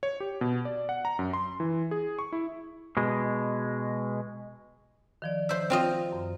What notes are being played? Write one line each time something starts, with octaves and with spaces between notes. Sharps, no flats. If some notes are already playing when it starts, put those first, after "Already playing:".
C#5
G4
B2
D5
F#5
A#5
F#2
C6
E3
G#4
C#6
E4
B2 G#3
D#3 F3 D5
C5 E5
C4 F4 D#5
F#2